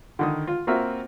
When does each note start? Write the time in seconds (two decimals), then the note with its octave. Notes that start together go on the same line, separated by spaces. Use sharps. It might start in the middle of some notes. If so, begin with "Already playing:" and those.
0.19 D3 D#3 D#6
0.47 F4
0.67 A#3 C4 F4 F#4 A#4 E5